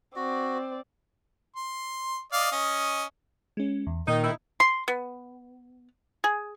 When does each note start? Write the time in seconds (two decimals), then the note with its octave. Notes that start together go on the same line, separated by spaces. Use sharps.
0.16 C4 F#4 D5
1.56 C6
2.33 D5 D#5 F5
2.52 C#4 D#5
3.57 G#3 C#4
3.87 E2
4.08 A#2 D#3 D#4
4.24 D#4 E4
4.60 C6
4.88 B3
6.24 G#4